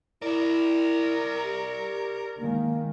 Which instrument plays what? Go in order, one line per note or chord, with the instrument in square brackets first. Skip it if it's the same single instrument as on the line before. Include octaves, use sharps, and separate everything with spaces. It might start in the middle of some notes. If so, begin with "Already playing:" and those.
[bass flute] E4 [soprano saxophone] A#4 [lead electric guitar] C5 D5
[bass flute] G4
[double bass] D#3 G#3 [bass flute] A#3